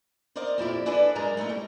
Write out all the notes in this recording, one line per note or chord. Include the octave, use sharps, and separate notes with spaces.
A#4 C5 D5 D#5 F5
F2 A#2 E4 G4
D4 E4 G#4 A4 B4 D5
F#2 G#3 G#4 A#4 D5 A#5
G#3 A3 D#4 E4
G3